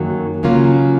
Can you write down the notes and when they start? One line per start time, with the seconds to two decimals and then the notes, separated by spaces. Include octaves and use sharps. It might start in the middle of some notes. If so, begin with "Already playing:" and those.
Already playing: F#2 D#3 F#3 A#3
0.43 C#3 F#3 A#3 C#4 F4